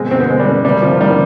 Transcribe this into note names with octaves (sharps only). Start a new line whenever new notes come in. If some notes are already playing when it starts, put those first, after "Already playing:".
Already playing: B2 G#3 C4
B2 C4
B3
B2 G#3
G3 B3
B2
C3 G3
C3 F3
D#3 G3